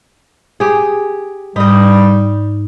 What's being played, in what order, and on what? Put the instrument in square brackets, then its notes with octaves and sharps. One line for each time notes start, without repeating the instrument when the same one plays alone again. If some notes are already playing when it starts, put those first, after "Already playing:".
[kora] G4 G#4
[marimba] G#2 [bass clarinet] G3 [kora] D#4 D#5